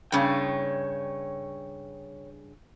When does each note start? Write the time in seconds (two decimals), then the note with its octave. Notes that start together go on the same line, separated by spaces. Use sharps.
0.12 G2 C#3 C#5 G5